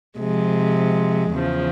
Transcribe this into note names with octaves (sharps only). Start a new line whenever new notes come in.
C3 F3 G#3
E2 C#3 F3